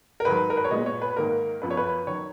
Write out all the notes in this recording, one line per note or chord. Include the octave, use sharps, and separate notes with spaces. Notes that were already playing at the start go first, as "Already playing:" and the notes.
A#4
G#2 D#3 F#3 B4
A#4
B4
C#5
A#2 G#3 B3 D#5
C#5
B4
G#2 D#3 A#3 A#4
F#2 F3 B3 B4
C#5
B4
D#3 F#3 C#5